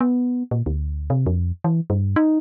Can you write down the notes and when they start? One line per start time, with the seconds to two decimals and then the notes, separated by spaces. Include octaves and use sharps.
0.01 B3
0.51 A#2
0.66 D2
1.10 C3
1.26 F2
1.64 E3
1.90 G2
2.16 D#4